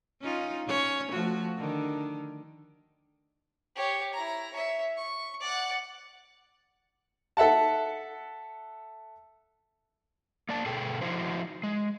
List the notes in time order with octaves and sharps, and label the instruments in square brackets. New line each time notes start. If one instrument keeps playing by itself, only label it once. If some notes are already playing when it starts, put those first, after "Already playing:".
[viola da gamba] C#4 D#4 F4
C#4 C#5
F3 A3 F#4
D3 D#3
[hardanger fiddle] G4 C#5
E4 A#5
C#5 E5
C#6
D5 F#5
[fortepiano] A4 E5 F#5 A5
[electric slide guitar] A#3 D5 A5
B2 G#4 A4 G5
F3 D#4 E4 F#4 C5
G#3